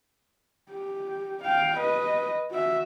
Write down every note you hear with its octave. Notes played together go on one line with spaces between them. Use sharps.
G4
F5 G5
B4 D#5
F#4 E5